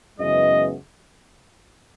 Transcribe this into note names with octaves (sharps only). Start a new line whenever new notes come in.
F#2 C#3 E3 G#3 B3 D#5